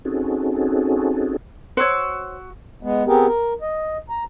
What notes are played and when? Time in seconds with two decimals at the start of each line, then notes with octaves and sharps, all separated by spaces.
0.05 C4 C#4 D#4 F#4 G#4 A4
1.77 F#4 C5 C#5 E6
2.83 G#3 B3
3.07 B3 C4 G4 G#4 A#4
3.26 A#4
3.62 D#5
4.09 A#5